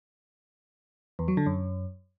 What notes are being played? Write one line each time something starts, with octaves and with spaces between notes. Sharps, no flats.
E2
F#3
D3
F#2